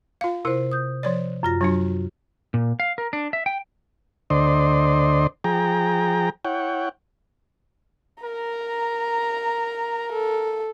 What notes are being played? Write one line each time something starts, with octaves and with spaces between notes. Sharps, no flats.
F4 F5
C3 E4 A#4 C5
D#6 G6
F3 C#5 D5
F#2 F4 A#6
F#3 D4 F#4
A#2
F5
A#4
D4
E5
G5
D2 D3 C5 D5 D#5 C6
F3 G#4 G5 A#5
E4 C#5 F#5 G5
A#4 A#5
A4